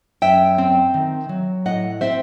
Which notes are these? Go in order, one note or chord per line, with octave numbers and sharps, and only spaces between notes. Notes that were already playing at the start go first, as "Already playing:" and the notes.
F#2 E5 G5
C4
D#3
F#3
A2 D#5 F#5
C4 C5 E5